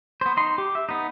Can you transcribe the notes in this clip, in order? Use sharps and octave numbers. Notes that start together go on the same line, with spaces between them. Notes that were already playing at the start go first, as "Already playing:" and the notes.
B3 C5
D#4 C6
G4
E5
B3 D#4